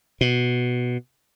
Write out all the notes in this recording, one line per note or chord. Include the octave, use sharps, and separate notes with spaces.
B2